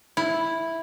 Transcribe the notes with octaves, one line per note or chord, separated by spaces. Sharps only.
E4